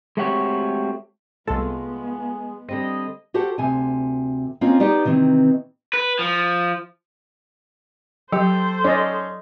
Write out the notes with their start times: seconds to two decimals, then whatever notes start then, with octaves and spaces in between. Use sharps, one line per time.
0.17 G#3 A3 C4 F#4 G4 C#5
1.47 C2 G#3 A3 B3 F4 A4
2.68 D3 G3 C4 D#5
3.34 F#4 G4 A4 C5 F#5
3.58 D2 C3 G#5
4.61 A#3 C4 C#4 F4 C#5 D#5
4.80 B3 D#4 G4 D5
5.05 C3 D#3 E3 C4
5.93 B4
6.19 F3
8.33 F#3 G4 A4 C5
8.84 C#4 D5 D#5